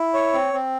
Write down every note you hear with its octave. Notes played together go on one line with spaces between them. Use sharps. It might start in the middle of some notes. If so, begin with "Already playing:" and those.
Already playing: E4
C#5
C4
C4